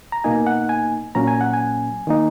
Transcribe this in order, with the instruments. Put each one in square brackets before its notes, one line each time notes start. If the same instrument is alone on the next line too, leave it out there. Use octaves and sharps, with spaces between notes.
[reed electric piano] A#5
B2 A#3 D#4 G#5
F#5
G#5
A#2 F#3 A#3 C#4 A#5
G#5
F#5
G#5
D#3 A#3 D#4